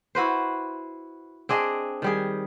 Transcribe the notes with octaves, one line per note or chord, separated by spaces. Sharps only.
E4 F#4 B4 C5
C4 D4 G#4 D#5
D#3 G3 G#4